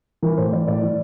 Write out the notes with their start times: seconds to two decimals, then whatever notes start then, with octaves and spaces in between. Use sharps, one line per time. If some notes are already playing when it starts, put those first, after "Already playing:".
0.22 E3 A#4
0.37 A2 C5
0.52 E3 D5
0.67 A2 D5
0.82 E3